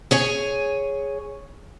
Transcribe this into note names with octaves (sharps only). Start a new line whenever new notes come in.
G#4 C#5 G#5